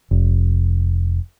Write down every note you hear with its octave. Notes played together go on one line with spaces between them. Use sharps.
F1